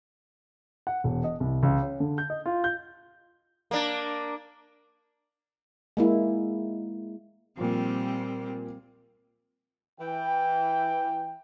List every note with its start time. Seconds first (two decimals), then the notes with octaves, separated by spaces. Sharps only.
0.87 F#5
1.04 E1
1.24 D#5
1.40 C2
1.63 C#2
1.82 C#4
2.00 D3
2.18 G6
2.30 D#5
2.46 F4
2.64 G6
3.71 A#3 D4
5.97 G#3 A#3 E4
7.57 A#2 F3 G3 C4
9.99 E3 G5